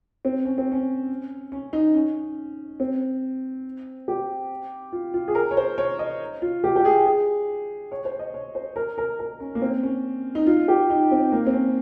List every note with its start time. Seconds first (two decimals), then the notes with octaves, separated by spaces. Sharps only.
0.25 C4
0.45 C#4
0.58 C4
0.72 C#4
1.52 C#4
1.73 D#4
1.95 C#4
2.80 C4
4.08 G4
4.92 F4
5.14 F4
5.28 G#4
5.35 A#4
5.51 C#5
5.57 C5
5.78 C#5
5.99 D#5
6.42 F4
6.64 G4
6.76 G4
6.85 G#4
7.06 G#4
7.92 C#5
8.05 C5
8.19 D#5
8.34 C#5
8.55 C5
8.76 A#4
8.98 A#4
9.19 A#4
9.40 C#4
9.55 A#3
9.62 C4
9.83 C#4
10.35 D#4
10.47 F4
10.68 G4
10.90 D#4
11.11 C4
11.32 A#3
11.47 C4
11.53 C#4